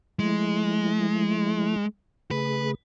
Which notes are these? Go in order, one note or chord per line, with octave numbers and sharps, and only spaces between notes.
F3 G#3 A3 E4
C#3 A3 G#4 B4